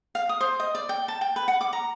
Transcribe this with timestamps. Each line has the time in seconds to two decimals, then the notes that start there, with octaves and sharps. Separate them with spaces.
0.15 F5
0.29 D#6
0.41 C5
0.60 D#5
0.75 D5
0.89 G5
1.08 A5
1.21 G5
1.36 B4
1.48 F#5
1.61 D6
1.73 A#5